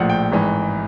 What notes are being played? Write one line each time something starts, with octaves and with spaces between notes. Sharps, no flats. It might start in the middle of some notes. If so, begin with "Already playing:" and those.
Already playing: A#1 A2 F3 F#5
G5
G#1 G#2 E3